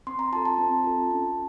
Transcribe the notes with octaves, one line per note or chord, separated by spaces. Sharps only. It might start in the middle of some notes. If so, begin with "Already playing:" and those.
C4 C6
A#5
F4 A4 A5
A5
C4
F4 A4
C#4